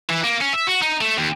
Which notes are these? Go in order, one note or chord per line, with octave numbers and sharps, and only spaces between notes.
E3
A#3
C#4
E5
F#4
D#4
A3
D#2